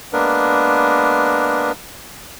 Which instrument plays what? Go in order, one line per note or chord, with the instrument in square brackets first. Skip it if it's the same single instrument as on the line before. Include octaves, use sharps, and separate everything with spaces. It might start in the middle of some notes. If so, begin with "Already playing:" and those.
[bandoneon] G#3 A#3 B3 D4 A#4 B4